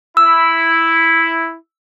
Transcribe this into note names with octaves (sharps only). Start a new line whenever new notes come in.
E4 E6